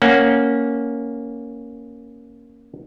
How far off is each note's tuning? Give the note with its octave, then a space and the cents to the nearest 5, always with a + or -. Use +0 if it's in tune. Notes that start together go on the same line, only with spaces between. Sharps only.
A#3 +0 C#4 +0 F#5 +0